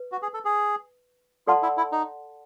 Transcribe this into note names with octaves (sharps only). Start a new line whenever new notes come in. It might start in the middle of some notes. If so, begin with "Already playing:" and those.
Already playing: B4
F#4
G#4
A4
G#4
F4 A4 D5 F#5 A5 C6
E4
E4
D#4